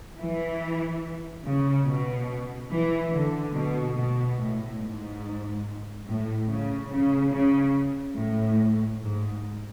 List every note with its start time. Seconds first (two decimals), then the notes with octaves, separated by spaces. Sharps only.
0.18 E3
1.44 C#3
1.86 B2
2.70 E3
3.12 D3
3.54 B2
3.96 B2
4.38 A2
4.80 G#2
6.06 A2
6.48 C#3
6.90 C#3
7.32 C#3
8.16 A2
9.01 G#2